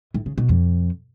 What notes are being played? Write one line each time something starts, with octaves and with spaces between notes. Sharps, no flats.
A2
C#3
B2
F2